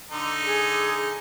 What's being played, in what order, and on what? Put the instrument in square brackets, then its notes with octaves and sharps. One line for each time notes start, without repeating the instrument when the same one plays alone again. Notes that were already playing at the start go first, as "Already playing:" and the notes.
[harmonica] D3 D#4
[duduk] G#4